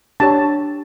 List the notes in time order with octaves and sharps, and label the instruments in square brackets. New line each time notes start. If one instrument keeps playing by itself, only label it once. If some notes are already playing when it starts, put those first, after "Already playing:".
[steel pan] D4 G4 C#5 A5